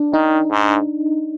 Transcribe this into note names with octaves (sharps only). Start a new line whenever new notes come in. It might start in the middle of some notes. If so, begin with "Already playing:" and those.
Already playing: D4
D#3 D#4
G#2